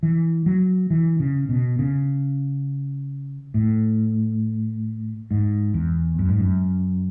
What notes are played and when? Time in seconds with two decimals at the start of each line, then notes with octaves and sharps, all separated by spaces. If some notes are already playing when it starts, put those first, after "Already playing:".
0.03 E3
0.46 F#3
0.90 E3
1.20 C#3
1.49 B2
1.79 C#3
3.54 A2
5.31 G#2
5.74 E2
6.19 F#2
6.29 G#2
6.40 F#2